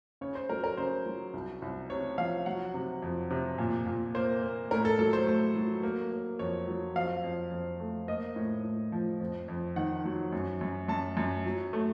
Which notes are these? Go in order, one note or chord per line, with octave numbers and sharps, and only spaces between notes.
C#3 C#5
C5
F#3 A#4
A#4
C#3 C5
F#3
C2
C2
C3 C#5
F3 F5
F#3 F#5
C3
F2
C3
A#2
A#2
A#3 C5
A#3
A2 A#4
A4
F#3 A4
C5
A3
F#3
A#3
A#3
F2 C#5
F#3
F2 F5
F2
F2
A3
A#3 D#5
A2
A2
F3
F2
F2
D#3 F#5
F#3
F#2
F#2
F#2 A5
F#2
F#3
A3